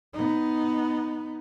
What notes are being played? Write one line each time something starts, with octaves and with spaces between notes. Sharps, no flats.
B3 D#4